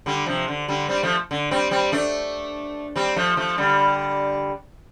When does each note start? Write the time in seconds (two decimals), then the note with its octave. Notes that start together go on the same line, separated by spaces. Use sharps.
0.06 D3 G3
0.26 C3 F3
0.48 D3
0.68 D3 G3
0.89 G3 C4
1.03 F3 A3
1.31 D3
1.51 G3 C4
1.71 G3 C4
1.92 A3 D4
2.96 G3 C4
3.16 F3 A3
3.37 F3 A3
3.58 D3 G3